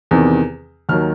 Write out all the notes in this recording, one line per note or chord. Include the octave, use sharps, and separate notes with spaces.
E2 C3 D#3
D#2 D#3 F#3 F6